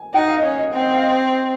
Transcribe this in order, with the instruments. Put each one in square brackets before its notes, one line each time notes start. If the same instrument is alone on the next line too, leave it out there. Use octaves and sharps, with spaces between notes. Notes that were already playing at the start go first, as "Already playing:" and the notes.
Already playing: [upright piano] G#5
[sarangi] D#4 [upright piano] F#5
[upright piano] F5
D#5
[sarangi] C#4
[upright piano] D#5
[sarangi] C4
[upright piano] D#5
F5
D#5